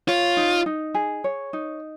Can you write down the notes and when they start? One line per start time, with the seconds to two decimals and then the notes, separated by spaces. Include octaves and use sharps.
0.08 F4 C#5
0.37 D#4
0.66 D#4
0.94 G#4
1.24 C#5
1.53 D#4